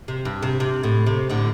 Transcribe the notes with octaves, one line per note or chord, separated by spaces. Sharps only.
C3
G2
C3
C3
A2
C3
A2 D3